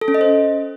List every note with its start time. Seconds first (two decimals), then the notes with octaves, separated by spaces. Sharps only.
0.01 A4
0.08 C#4
0.14 D#5
0.21 C5